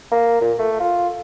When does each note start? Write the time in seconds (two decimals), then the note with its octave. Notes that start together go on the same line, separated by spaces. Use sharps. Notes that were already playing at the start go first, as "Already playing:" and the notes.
0.12 A#3
0.41 A#2
0.59 A3
0.80 F4